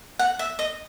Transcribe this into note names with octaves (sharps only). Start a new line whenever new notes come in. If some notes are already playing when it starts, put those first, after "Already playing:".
F#5
E5
D#5